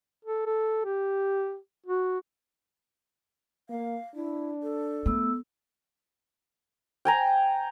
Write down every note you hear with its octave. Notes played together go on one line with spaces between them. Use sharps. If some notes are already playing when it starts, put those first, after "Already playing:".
A4
A4
G4
F#4
A#3 F5
D4 E4
A4
A3 B3 E6
G5 G#5 A#5